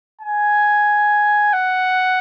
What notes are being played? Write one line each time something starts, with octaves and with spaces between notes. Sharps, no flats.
G#5
F#5